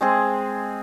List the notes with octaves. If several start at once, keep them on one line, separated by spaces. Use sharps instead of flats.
G#3 C4 G#4